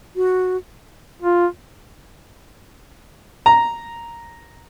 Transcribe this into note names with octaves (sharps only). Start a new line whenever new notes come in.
F#4
F4
A#5